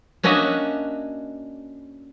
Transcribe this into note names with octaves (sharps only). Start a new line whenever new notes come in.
A#3 C#4 D4 F#4 D#5 E5